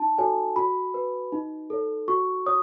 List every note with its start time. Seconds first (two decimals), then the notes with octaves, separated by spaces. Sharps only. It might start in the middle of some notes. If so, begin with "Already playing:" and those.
Already playing: D#4 A5
0.18 F#4 A4 C#5 G#5
0.56 F#4 B5
0.94 B4
1.32 D#4
1.70 A4 C#5
2.08 F#4 C#6
2.46 C#5 D#6